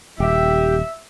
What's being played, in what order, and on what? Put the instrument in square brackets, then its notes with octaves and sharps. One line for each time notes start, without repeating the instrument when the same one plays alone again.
[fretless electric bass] D#1 [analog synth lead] G4 [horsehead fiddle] E5